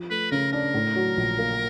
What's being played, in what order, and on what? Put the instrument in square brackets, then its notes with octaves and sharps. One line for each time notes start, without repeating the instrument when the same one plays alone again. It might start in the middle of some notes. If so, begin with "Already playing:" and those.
Already playing: [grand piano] F3
[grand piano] A3 [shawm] B4
[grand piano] C#3 [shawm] A#4
[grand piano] D4 [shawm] A#4
[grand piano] A2
F#3
A#1
A#3